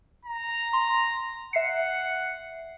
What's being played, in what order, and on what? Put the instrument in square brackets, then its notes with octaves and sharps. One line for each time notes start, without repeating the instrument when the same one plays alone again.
[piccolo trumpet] A#5
[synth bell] C6
[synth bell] E5 C7 C#7 [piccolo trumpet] F#5